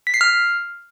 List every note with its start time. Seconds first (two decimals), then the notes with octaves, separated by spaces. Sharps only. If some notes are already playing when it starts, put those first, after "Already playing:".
0.07 B6
0.14 C7
0.21 F6